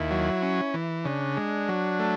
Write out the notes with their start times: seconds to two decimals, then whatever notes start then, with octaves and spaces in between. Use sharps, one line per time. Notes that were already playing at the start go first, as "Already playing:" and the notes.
Already playing: D#2 E4
0.11 F#3
0.43 C#4
0.74 E3
1.05 C#3 D4
1.37 G#3
1.69 F#3
1.99 A3